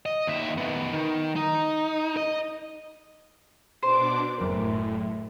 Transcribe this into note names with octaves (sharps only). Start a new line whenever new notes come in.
D#5
D#2 E5
D#3 B3
D#3
D#4
D#5
B2 D4 C5 D6
F#1 A2 A#4